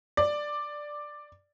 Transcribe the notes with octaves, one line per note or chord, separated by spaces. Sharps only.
D5